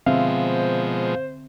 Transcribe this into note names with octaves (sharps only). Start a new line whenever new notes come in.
B2 D3 F3 G#3 C4 C5 E5 F5